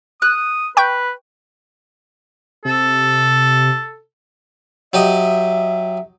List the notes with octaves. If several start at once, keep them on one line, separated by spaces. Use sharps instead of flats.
D#6 F#6
B4 G5 C#6 G6
C3 A4
F#3 G4 D#5 E5